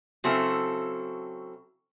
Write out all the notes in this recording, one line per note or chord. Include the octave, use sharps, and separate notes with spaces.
C#3 F#3 C4 E4 F#4 A4